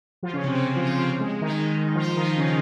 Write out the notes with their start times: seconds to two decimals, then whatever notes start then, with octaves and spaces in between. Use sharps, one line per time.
0.23 F3 F4
0.33 C#3 C#4
0.44 C3 C4
0.55 C3 C4
0.66 C#3 C#4
0.76 F3 F4
0.87 F3 F4
0.98 C3 C4
1.20 G#3
1.41 D#3 D#4
1.95 F3 F4
2.16 D#3 D#4
2.38 C#3 C#4